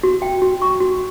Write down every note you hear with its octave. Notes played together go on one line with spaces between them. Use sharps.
F#4
G5
F#4
C#6
F#4